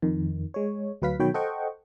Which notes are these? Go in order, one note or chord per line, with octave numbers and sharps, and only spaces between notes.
F2 D#3
G#3 C#5
D2 F#3 B4 F5 B6
B2 D#3 F#3 C#5 G5 B5
A4 C5 D#5 F#5 G5 C#6